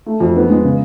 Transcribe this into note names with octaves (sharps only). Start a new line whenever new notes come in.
A3
F2
B3
G#3
C#3